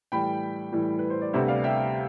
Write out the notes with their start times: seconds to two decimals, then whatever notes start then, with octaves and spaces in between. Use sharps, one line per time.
0.12 A2 E3 G3 G5 B5
0.72 A2 E3 G3
0.99 B4
1.10 C5
1.21 D5
1.33 D2 C3 G3 B3 C5 E5
1.48 D5 F5
1.64 E5 G5